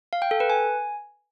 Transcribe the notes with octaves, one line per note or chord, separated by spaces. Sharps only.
F5
G5
A4
B4
G#5